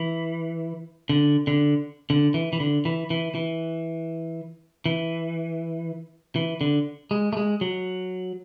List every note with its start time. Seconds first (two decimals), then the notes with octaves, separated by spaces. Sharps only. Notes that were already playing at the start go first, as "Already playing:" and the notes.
Already playing: E3
1.09 D3
1.47 D3
2.10 D3
2.34 E3
2.53 E3
2.60 D3
2.85 E3
3.10 E3
3.35 E3
4.86 E3
6.36 E3
6.61 D3
7.11 G#3
7.33 A3
7.37 G#3
7.61 F#3